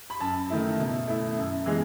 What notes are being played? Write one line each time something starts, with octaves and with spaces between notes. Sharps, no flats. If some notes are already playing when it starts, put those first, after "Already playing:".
B5
F#2 A5
D#3 A3 E4
B2
A3 E4
F#2
E3 G#3 B3